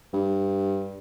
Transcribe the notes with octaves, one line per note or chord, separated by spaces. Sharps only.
G2